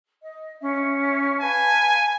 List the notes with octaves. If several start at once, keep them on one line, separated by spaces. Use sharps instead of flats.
D#5
C#4 E5
B4 F5 G#5 A5